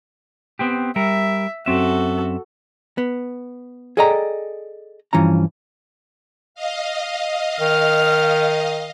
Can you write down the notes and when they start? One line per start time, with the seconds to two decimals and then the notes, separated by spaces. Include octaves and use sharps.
0.59 B3 C4 G4
0.96 G3 A#4 E5
1.66 F#2 C4 F#4 A4 E5
2.98 B3
3.97 G#4 A4 D5 D#5 G5 A#5
5.13 G2 E3 F3 C#4 A#5
6.55 D#5 F5
7.60 D#3 F6